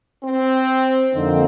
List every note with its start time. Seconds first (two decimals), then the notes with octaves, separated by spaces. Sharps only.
0.24 C4
1.13 F2 D3 F3 A#3 C4 D#4